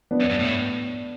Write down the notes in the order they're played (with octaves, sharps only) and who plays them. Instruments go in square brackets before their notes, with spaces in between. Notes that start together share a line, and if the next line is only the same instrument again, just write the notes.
[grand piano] B3 D4
[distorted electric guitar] F#2
G2
A2